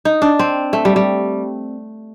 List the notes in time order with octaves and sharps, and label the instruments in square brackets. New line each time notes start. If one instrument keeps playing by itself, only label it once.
[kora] D#4
D4
C4
A3
G3
G3